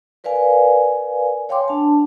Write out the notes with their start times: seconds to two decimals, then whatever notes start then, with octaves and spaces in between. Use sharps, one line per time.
0.24 A#4 B4 D5 F5 G#5
1.49 C#5 F5 G5 G#5 C6 D6
1.68 D4 A5